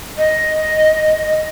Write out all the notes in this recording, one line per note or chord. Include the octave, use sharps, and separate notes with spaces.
D#5